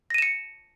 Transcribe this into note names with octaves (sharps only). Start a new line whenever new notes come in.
A#6 C#7 D#7 E7